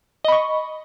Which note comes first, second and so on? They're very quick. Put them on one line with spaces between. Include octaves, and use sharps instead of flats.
D#5 B5 C#6